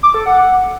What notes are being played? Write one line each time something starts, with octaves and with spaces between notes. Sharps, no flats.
D6
A4
F#5